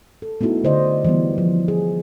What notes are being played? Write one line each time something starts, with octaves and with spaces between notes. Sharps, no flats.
A4
A3 B3 D#4 E4 F#4
D3 C5 D5 D#5
E3 G3 B3
F3
G#4